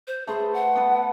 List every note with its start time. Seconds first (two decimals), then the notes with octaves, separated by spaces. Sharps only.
0.07 C5
0.27 A3 G#4 B4 C5
0.54 F#5
0.75 B3 A4 B4